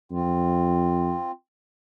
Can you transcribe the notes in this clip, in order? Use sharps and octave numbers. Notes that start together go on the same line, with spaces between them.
F2 C4 F4